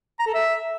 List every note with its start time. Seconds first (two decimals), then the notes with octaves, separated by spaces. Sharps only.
0.19 A#5
0.27 A4
0.34 E5